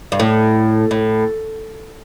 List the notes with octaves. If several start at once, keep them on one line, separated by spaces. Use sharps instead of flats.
G2
A2
A2